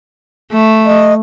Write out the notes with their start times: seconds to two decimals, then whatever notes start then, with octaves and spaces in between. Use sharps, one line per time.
0.52 A3
0.86 D#5